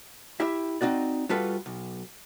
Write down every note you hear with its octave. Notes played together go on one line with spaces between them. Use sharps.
E4 G4 E5
C4 D#4 F#4 D5
G3 F4 F#4 A4 B4 F5
B1